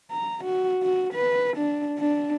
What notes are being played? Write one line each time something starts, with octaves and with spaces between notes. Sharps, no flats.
A#5
F#4
F#4
B4
D4
D4